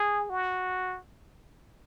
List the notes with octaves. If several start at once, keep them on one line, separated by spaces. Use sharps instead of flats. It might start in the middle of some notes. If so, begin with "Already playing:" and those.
Already playing: G#4
F#4